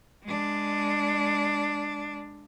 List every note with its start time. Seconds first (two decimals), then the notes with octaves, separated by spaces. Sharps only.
0.24 G#3 D4